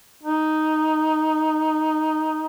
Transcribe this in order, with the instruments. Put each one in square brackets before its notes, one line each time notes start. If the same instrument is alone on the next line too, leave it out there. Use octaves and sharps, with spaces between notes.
[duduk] D#4